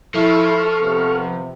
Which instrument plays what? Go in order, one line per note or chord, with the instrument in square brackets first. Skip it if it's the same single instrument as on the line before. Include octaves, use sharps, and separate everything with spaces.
[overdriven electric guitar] F3 [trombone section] E4 [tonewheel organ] A4 C#6 F6
[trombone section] C3 B3